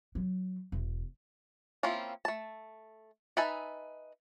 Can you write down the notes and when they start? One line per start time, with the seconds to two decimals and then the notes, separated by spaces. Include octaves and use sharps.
0.15 F#3
0.72 E1
1.83 A#3 C4 C#4 E4 F4
2.25 A3 A5
3.37 D#4 B4 E5 G#5 A5